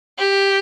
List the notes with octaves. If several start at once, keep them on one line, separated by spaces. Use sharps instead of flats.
G4